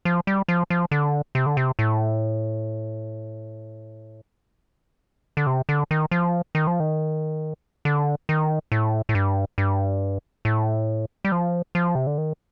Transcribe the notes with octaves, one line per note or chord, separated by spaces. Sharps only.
F3
G3
F3
F3
D3
C3
D3
C3
A2
D3
C3
D3
D#3
F3
D#3
F3
D#3
D3
D#3
A2
A2
G2
G2
A2
G3
F3
F3
C3
D3
D#3